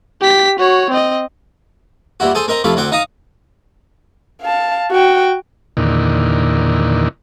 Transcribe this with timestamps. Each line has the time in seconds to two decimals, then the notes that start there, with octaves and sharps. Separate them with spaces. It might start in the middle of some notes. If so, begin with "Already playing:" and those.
0.21 G4 B6
0.59 F#4 C#5
0.90 C4 D#5
2.20 A#2 G3 E4 F#4
2.35 G#4 A4 C5 G#5
2.48 C4 A#4 D#5 A#5
2.64 C3 F3 A3 E4 F5
2.76 D2 C4 F#5 D6
2.92 D#4 F5 A#5 D#6
4.42 F5 A5
4.91 F#4 G5
5.77 E2 A#2 D3 D#3